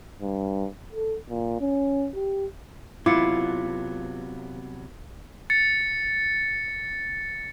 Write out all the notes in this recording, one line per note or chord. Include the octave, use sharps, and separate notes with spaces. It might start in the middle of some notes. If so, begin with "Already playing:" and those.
G2
A4
A#2
C#4
G4
C3 F#3 B3 E4 F4 D6 C#7
A6 C#7